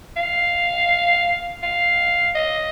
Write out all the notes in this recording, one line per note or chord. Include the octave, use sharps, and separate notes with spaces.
F5
F5
D#5